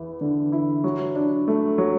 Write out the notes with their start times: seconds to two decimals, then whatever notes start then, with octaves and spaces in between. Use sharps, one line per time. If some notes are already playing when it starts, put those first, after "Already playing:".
Already playing: E2 E4
0.21 D3
0.52 E4
0.84 F#3
1.15 D4
1.48 A3
1.78 F#3